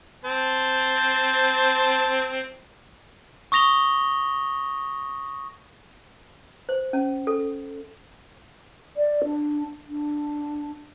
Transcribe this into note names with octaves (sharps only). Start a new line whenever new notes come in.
C4 C5 A5
C#6 D#6 A#6 F7 G7
C5
C#4
A4
D5
D4
D4